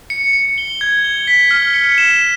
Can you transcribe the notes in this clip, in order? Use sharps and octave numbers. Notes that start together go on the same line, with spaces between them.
C#7
C#7
G7
G#6
G7
B6
F6
C#7
E7